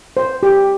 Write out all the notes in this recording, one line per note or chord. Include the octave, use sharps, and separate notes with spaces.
C5
G4